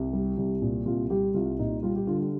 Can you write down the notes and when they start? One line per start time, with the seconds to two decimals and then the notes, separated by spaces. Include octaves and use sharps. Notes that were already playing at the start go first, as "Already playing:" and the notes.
Already playing: C2 G4
0.13 G3
0.37 C2
0.62 A#2
0.86 C2 F4
1.10 G3 G4
1.34 C2 F4
1.59 A#2 D#4
1.83 G3 F4
1.96 G4
2.07 D3 F4
2.20 G4